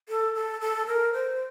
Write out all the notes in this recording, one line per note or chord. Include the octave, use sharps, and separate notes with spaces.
A4
A4
A4
A#4
C5